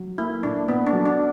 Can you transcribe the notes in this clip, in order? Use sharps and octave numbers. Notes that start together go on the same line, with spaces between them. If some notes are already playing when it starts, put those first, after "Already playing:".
Already playing: F#3
A#3 E4
A#2 D4
A#2 B3
D4
F#3
D4